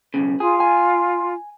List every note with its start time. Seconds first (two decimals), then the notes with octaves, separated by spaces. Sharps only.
0.14 B1 E2 C#3
0.40 F4 G#4
0.60 G#5